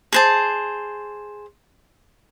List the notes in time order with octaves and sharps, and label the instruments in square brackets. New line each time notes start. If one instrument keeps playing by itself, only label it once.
[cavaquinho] G#4 C5 A5